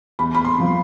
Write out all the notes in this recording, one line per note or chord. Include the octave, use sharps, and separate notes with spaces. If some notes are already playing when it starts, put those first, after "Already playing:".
E2 B5
B5
C6
C3 F3